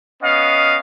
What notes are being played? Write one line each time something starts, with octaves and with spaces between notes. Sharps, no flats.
B3 C#4 D#5 F5